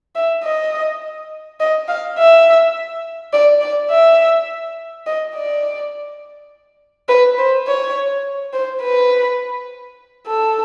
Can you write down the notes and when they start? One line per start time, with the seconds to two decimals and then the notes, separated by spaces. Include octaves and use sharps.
0.15 E5
0.44 D#5
1.60 D#5
1.88 F5
2.18 E5
3.33 D5
3.62 D5
3.91 E5
5.07 D#5
5.35 D5
7.09 B4
7.38 C5
7.67 C#5
8.53 C5
8.82 B4
10.27 A4